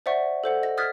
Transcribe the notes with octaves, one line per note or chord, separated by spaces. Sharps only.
C5 D5 E5 F#5 C#6
A4 C5 F#5
D#5 A#6
D#6 F6 F#6 G#6 A6 B6